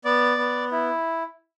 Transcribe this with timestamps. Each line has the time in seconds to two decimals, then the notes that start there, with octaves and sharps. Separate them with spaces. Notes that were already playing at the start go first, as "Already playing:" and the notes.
0.05 B3 D5
0.38 B3
0.71 E4